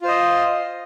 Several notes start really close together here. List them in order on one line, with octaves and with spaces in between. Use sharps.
F4 C5 D#5